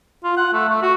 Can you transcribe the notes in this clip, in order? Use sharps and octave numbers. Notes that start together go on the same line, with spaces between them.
F4
F#5
A3
A3
F#4